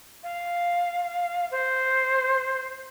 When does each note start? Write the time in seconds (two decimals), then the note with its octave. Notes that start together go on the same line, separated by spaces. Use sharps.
0.23 F5
1.51 C5